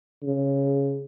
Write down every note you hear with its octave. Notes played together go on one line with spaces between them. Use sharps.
C#3